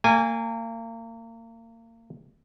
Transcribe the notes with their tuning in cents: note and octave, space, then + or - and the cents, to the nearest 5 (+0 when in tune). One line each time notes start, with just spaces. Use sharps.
A#3 -35 G#5 -20